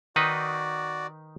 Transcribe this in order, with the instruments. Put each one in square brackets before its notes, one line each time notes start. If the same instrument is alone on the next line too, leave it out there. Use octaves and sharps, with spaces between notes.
[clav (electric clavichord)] D#3 D#4 B4 [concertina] F#4 D5